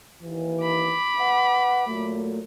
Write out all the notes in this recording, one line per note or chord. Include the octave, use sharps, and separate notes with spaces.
D#2 E3
B5 D6
B4 E5 F#5
A#2 F#3 A3